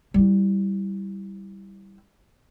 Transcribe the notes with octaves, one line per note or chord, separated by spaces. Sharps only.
G3 E4